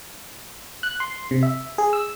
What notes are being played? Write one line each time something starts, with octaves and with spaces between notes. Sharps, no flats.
F#6
C6
C3
E5
G#4
E6